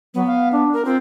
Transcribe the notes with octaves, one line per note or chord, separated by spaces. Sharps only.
F#3 B3
F5
D4
A#4
C4 F4